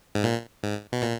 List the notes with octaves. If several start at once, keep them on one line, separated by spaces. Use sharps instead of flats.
G#2
A#2
G#2
B2
A#2